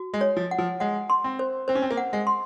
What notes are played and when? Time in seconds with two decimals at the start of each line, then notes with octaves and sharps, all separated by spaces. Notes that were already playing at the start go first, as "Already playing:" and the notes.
Already playing: F#4
0.14 G#3
0.21 C#5
0.37 F3
0.51 F#5
0.58 F3
0.80 G#3 F#5
1.10 C6
1.24 C4
1.39 C5
1.68 C4 C5
1.75 C#4
1.82 C4
1.91 A#3
1.97 F#5
2.13 G#3
2.27 C6